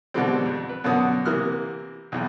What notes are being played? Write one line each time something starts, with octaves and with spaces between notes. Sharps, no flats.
B2 D3 E3 G3 G#3 C4
F2
B4
F#2 B2 D3 B3 F#4 D#6
C3 E3 A#3 D#6 F6 F#6
B1 E2